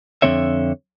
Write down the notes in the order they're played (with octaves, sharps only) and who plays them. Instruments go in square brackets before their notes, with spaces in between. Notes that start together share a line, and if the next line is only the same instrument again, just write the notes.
[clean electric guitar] F2 D3 E3 C4 C#5 E5